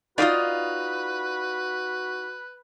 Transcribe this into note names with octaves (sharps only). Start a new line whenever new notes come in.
D#4 F4 F#4 B4 D5 F5 D#6